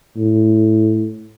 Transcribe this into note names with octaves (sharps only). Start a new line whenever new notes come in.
A2